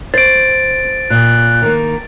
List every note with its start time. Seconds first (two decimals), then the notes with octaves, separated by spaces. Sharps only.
0.14 C5 A6 D7
1.10 A#2 F#6
1.62 D#3 A#3